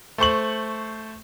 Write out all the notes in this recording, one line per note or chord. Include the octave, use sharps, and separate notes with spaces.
A3 C5 C#6 F#7